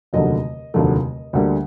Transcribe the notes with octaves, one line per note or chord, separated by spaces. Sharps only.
F1 D#2 D3 F#3 A3 D#5
F1 D#2 D3 F#3 A3
D2 D3 G3 A#3